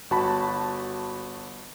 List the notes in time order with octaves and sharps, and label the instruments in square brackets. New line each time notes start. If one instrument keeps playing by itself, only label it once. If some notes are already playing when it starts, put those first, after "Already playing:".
[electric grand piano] G1 F#4 A5 B5